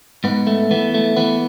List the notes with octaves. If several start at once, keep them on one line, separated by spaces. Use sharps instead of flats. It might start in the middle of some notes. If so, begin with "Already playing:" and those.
G#2 B3
A3
E3 B3
A3
E3 B3